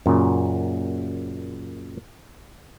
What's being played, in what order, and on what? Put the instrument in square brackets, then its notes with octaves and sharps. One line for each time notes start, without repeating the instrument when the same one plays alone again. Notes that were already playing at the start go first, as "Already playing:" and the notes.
[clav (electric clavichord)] F#2 A#2 C#3